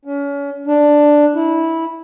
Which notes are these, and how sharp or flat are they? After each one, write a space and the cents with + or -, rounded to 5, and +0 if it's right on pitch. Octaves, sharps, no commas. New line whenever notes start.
C#4 +35
D4 +5
E4 -15